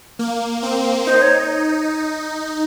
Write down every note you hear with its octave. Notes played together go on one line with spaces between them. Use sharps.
A#3
C4
D#4 C5
C#5